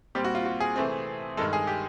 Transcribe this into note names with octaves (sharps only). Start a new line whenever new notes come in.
A#2 G3 C4 G4
F#4
F4
F#4
G#4
C3 E3 A3 C4
G2 D#3 G#3 A4
G#4
G4